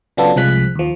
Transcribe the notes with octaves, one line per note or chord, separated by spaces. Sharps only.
C#3 F#3 B3 D4 F4 A4
C2 C3 F3 G#3 F#6 B6
D#2 F3